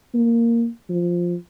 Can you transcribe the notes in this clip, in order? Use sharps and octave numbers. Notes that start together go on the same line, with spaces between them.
A#3
F3